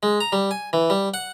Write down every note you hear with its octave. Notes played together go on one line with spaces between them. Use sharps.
G#3
A#5
G3
G#5
E3
G3
F#5